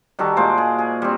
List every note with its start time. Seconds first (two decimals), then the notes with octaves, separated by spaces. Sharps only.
0.19 D#3 G3 F#4 A4
0.37 A#2 G#3 C5 D6
0.58 G#4
0.78 G#4
1.02 G3 C4